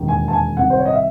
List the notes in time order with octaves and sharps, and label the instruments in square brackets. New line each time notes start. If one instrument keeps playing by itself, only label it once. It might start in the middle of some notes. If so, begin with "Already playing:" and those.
Already playing: [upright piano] E1 D#2 D#3
G#5
A5
G#5
C2 C3 D#3 F#5
C5
C#5
D#5
E5